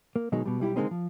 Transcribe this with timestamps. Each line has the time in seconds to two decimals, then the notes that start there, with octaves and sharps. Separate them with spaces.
0.16 A#3
0.32 B2 D#3 F#3 G#3 D#4
0.46 B2 G3
0.60 B1 G3 E4 G4
0.76 D3 F3 G#3 A#3 C4 D#4
0.91 F3